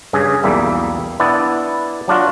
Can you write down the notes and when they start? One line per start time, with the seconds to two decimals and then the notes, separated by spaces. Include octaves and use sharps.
0.13 G2 C#3 G#4
0.44 B1 E2 G3 A#3 E5
1.20 B3 D4 E4 D5
2.08 F#3 D4 F4 F#4